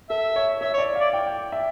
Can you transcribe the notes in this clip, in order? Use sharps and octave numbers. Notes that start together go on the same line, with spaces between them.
A4 E5
C#5
C#5 E5
C#5
D5
D5 F5
G5
G5
E5